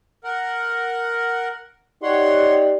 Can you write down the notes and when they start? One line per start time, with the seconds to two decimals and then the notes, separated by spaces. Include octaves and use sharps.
0.24 A#4 F#5
2.03 D#4 G4 C#5 D5 F#5 C6